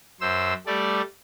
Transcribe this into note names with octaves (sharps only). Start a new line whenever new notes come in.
F#2 C5 E6
G3 A3 D5